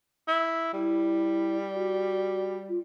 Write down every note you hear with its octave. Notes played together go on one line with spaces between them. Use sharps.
E4
G3 E4
F#4
F4